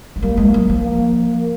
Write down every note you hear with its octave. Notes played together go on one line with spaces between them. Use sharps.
F#3
G3 A#3
G#3
F#3
F3
A#3